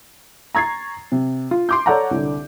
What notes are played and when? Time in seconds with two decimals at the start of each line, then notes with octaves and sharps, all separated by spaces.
0.55 A#5 C#6 G#6 A6 C7
1.12 C3
1.51 F4
1.69 C6 D6 G6
1.86 A4 C#5 D5 F#5 A5 A#5
2.11 C2 D3